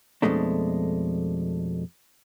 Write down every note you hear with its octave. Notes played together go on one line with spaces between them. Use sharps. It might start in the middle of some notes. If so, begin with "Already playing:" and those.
F2 B2 G#3 A3 D4